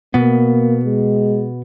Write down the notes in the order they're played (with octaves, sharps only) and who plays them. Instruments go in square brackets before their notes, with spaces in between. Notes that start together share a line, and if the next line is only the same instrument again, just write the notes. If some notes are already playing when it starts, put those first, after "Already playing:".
[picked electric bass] B2 B3 [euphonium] A#3
[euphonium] G#3